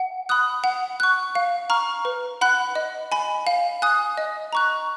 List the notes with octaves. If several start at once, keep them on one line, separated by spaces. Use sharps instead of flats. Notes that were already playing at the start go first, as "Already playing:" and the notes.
Already playing: F#5
B5 D#6 F#6
F#5
C#6 F#6
F5
A#5 C#6 F6
B4
F#5 B5 F#6
D#5
G#5 B5
F5
G#5 D#6 F#6
D#5
A#5 C#6 F#6